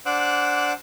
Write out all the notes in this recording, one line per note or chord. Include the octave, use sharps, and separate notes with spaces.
D4 C5 F#5 D6 E6 F#6